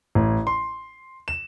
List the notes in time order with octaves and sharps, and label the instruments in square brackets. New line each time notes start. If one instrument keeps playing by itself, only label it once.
[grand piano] A1
C6
E7